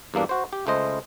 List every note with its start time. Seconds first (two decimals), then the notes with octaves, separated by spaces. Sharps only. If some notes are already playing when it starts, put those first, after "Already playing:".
0.14 E2 G2 A#3 D4
0.29 F#4 C5
0.53 G4
0.67 C#2 A3 C5 D#5